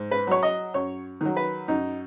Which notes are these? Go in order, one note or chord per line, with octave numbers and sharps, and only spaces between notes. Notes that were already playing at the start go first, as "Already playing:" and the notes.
Already playing: G#2
B4
F#3 C#5
D#5
F#2 C#5
D#3 F#3
B4
F#2 D#4